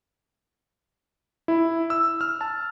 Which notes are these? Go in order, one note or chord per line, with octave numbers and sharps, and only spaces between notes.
E4
E6
F6
A5